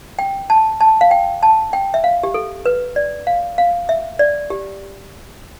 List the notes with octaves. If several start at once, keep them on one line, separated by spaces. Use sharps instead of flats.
G5
A5
A5
F5
G5
A5
G5
E5
F5
G4
A4
B4
D5
F5
F5
E5
D5
G4